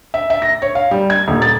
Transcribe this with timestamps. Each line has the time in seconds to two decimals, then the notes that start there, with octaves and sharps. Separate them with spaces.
0.14 E5
0.30 E5
0.42 A#6
0.62 C#5
0.75 F5
0.91 G3
1.10 G#6
1.28 D#1
1.42 A6